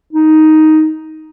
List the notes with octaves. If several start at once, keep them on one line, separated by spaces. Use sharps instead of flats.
D#4